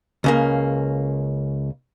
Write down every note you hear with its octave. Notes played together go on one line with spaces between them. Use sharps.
C#2 C#3 A#3